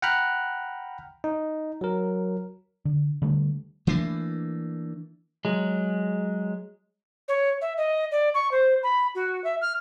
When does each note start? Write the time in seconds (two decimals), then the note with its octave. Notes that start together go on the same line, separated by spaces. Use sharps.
0.02 F#5 G5 A#5 B5 F6 F#6
1.24 D#4
1.81 F#3 A#4
2.85 D3
3.22 D3 G3 A3
3.87 E3 A3 A#3 D4
5.45 F#3 G#3
7.28 C#5
7.61 E5
7.77 D#5
8.12 D5
8.34 C#6
8.51 C5
8.83 B5
9.15 F#4
9.44 E5
9.61 F6